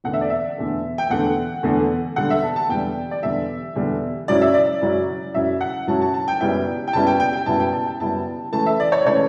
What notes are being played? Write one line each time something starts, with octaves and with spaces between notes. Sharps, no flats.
E2 D3 A3 F#5
E5
D5
E5
E2 D3 A3
G5
E2 D3 A3 F#5
E2 D3 A3
E2 D3 G3 F#5
E5
A5
A5
E2 D3 G3 G5
D5
E2 D3 G3 E5
E2 D3 G3
F#2 C#3 F#3 C#4 E4 D5
E5
D5
F#2 C#3 F#3 C#4 E4
F#2 C#3 F#3 C#4 E4 E5
F#5
F#2 C#3 F#3 C#4 E4 A5
A5
A5
G5
F#2 C#3 G3 B3 E4 G5
G5
F#2 C#3 G3 B3 E4 A5
G5
G5
G5
F#2 C#3 G3 B3 E4 A5
G5
A5
G5
F#2 C#3 G3 B3 E4 A5
C#3 E3 A3 A5
E5
D5
C#5
C#3 E3 A3 C#5